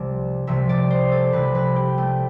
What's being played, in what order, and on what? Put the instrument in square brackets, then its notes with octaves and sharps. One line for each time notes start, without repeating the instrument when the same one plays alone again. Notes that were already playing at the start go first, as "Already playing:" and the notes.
Already playing: [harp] C2 C3 F3 D5
C2 C3 F3 E5
D5
C5
A4
C2 C3 F3 B4
B4
G4
A3